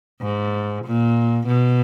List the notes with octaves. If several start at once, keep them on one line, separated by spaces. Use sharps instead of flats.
G#2
A#2
B2